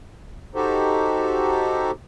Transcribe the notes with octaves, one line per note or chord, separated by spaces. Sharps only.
D#4 F#4 G4 A4 C5